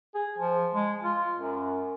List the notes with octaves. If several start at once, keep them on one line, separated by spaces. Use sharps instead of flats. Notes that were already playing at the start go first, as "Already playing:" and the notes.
G#4
F3
G#3
F4
F#2